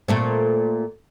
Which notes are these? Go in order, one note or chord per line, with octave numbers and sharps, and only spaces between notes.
A#2 A3 C4